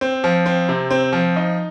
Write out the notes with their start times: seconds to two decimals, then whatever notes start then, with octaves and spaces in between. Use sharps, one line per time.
0.01 C4
0.24 F3
0.46 C4
0.69 C3
0.91 C4
1.13 F3
1.36 D#4